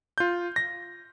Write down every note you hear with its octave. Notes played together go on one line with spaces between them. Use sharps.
F4 G6
A#6